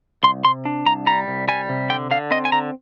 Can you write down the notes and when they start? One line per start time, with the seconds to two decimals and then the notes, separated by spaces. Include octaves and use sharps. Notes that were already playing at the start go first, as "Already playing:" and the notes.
0.23 C2 C6
0.45 C3 C6
0.65 D4
0.86 C2 A#5
1.07 G3 A#5
1.28 C2
1.48 G3 G#5
1.69 C3
1.90 D3 G5
2.11 D3 F5
2.31 C4 D#5
2.45 G#5
2.52 D3 A#5